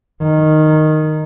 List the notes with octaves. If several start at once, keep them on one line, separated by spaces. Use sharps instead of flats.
D#3